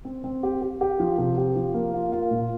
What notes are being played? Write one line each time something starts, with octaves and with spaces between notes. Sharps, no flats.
C4
C4
G4
G4
G4
F3
C3
G4
F3
A#3
F4
F4
A#2